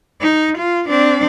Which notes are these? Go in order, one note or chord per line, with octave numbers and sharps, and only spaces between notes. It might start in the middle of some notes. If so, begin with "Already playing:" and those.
D#4
F4
C4 D4